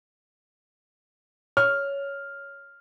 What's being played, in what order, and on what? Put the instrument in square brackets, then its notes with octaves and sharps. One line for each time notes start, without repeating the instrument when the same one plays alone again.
[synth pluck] C#5 [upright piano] F6